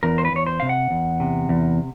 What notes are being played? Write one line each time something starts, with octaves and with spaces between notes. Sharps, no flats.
E2 A#4
C5
B4
E2 C#5
C5
C3 F5
F#5
E2
C3
E2